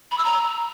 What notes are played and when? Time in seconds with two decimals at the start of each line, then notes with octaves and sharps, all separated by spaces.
0.11 B5
0.18 E6
0.25 A#5